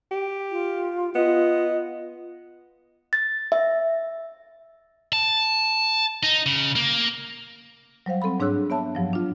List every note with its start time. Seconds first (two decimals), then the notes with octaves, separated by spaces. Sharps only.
0.11 G4
0.52 F4
1.15 B3 F4 D#5
3.13 A6
3.52 E5
5.13 A5
6.23 D#4
6.46 C#3
6.76 A#3
8.06 F#3 G3 C5 F5
8.22 C4 A4 F#5 B5
8.40 G#2 D4 G#4 C#5 E6 F#6
8.70 B3 C#5 E5 A5
8.95 G2 F3 F#3
9.13 D4 F4